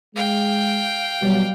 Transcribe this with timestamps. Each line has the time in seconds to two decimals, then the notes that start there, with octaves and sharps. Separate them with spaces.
0.15 G#3 F5 G5
1.22 B2 F#3 G3